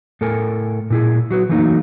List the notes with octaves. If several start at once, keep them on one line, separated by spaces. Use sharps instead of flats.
A2 A4 A#4 G#5
A#2 E4 G#4
F#3 F#4 B4
E3 F#3 A3 A#3 D#4